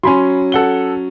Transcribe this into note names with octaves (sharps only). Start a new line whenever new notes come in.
F#3 C#4 G#5 B5 C6
A4 F#5 G7